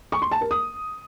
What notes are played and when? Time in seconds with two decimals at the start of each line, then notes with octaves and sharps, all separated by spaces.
0.12 C#6
0.22 C6
0.31 A5
0.41 A#4
0.51 D#6